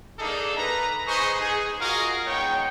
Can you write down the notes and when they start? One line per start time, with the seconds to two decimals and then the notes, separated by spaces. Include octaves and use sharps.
0.19 A#3 D4 D#4 G#4 A4
0.58 B4 A#5
1.07 D#4 G#4 B4 C5 D#5 C#6
1.40 G#4
1.80 F4 F#4 G#4 A#4 D#5 F5
2.27 G#3 B3 D#4 C#5 G5